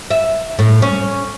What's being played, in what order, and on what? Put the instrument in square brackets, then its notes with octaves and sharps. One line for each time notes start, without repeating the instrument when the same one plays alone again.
[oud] E5
A2
C#4